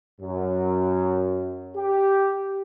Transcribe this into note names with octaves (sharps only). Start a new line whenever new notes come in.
F#2
G4